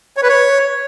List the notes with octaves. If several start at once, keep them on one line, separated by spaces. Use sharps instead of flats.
C#5
B4
C#5